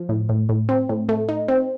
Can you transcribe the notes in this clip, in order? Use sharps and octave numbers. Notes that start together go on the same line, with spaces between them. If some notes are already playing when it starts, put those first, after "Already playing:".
Already playing: F3
A2
A2
A2
C4
A2
A3
D#4
C4